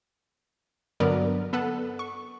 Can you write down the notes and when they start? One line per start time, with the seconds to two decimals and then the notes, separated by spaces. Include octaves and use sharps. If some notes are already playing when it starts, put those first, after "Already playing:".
1.00 G2 D3 F#3 B3 A#4 D5
1.53 B3 A4 B4 F#5
1.99 C#6